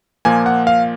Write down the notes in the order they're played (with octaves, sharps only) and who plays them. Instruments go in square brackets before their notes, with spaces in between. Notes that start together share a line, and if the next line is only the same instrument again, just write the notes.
[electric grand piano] A#2 F3 A#3 G#5
F#5
F5